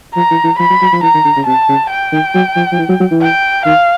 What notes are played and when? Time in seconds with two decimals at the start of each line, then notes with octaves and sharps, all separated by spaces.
0.15 F3 A#5
0.31 E3
0.44 E3
0.59 F3 B5
0.70 F#3
0.81 F#3
0.92 F3
1.02 E3 A#5
1.14 D#3
1.24 D3
1.36 C#3
1.47 C3 A5
1.69 C#3
1.90 G5
2.12 D#3
2.35 F#3
2.56 F3
2.72 F3
2.78 E3
2.89 F#3
3.00 F#3
3.11 E3
3.22 G5
3.66 D#3 F5